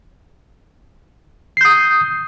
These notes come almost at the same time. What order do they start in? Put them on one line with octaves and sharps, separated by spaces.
C7 G6 D#6